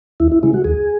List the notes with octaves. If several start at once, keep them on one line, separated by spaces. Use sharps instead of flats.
D#2 E4
E4
C#3 G#3 E4
F#4
D#2 G#4